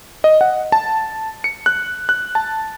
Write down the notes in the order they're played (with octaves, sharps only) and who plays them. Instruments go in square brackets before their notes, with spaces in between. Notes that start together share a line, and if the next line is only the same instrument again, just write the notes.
[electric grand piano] D#5
F#5
A5
C#7
F#6
F#6
A5